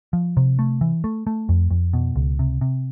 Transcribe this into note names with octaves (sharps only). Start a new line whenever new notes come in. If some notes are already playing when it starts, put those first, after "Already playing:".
F3
C3
A3
E3
A3
A3
F2
F2
B2
C#2
C3
C3